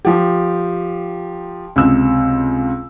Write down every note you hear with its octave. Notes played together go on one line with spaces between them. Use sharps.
F3 G4
C#2 C3 E6